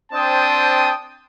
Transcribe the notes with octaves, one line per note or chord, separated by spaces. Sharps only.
C4 D4 C5 G5 A5 D#6